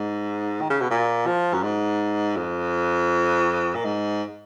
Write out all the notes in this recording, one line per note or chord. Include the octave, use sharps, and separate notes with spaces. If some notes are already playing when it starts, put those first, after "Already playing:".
Already playing: G#2
D#3
C#3
B2
A#2
F3
F#2
G#2
F2
A#2
G#2